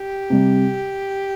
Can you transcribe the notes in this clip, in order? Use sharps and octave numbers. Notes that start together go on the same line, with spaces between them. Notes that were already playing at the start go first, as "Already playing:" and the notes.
Already playing: G4
C3 G3